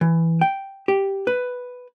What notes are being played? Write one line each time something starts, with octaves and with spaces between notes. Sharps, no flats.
E3
G5
G4
B4